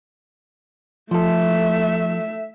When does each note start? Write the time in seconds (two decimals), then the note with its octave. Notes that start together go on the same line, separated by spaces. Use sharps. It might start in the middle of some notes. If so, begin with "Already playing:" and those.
1.11 F3 A3 A4 E5